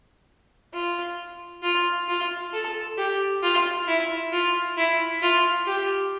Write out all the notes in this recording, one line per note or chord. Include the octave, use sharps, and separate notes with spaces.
F4
F4
F4
A4
G4
F4
E4
F4
E4
F4
G4